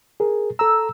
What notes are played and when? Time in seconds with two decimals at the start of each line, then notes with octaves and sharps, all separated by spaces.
0.20 G#4 A#4
0.59 A4 A#5 E6